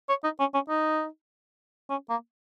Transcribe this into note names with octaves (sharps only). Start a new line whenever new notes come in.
C#5
D#4
C#4
C#4
D#4
C#4
A#3